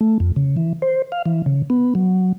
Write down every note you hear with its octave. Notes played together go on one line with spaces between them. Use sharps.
A3
F2
C#3
E3
C5
F5
E3
C#3
B3
F#3